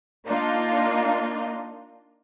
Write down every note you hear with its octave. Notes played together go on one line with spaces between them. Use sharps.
A#3 D4 D#4 F4